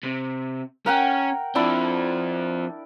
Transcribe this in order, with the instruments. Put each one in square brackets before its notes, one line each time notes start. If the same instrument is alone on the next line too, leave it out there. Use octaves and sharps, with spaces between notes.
[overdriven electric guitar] C3
[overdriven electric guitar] C#4 [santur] A#4 F#5 G5
[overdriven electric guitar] F3 C4 [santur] D4 E4 D5